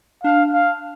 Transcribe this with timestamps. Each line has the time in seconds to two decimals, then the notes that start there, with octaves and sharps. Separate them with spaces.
0.23 D4 F5
0.52 F5